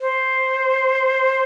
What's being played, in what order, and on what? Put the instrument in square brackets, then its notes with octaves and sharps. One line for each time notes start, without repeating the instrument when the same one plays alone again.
[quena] C5